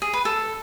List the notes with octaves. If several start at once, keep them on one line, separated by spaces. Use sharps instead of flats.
G#4
B4
A4